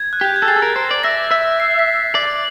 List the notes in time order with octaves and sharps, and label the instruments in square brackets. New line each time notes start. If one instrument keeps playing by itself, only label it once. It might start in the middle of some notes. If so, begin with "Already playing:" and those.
Already playing: [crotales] G#6
F#6
[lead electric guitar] G4 [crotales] G6
[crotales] G#6
[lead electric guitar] A4
[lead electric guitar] G#4 [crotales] A6
[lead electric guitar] A4
A#4
C5
D5
[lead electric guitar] E5 [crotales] A#6
[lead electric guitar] E5
[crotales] C7
B6
[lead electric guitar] D5